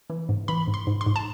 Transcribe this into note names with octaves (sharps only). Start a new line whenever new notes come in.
E3
G#2
E3 B5
G#2
C6
G#2
C6
G#2
A5